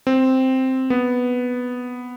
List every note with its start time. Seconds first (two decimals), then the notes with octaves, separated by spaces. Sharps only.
0.07 C4
0.90 B3